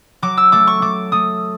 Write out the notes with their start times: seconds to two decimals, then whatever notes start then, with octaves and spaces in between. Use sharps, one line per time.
0.22 F#3 D6
0.37 E6
0.52 A3 D6
0.67 C#6
0.82 A3 D6
1.12 A3 D#6